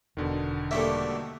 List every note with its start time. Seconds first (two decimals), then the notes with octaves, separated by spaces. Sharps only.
0.17 E1 B2 D3 D#3
0.71 G3 A3 A#3 A4 E5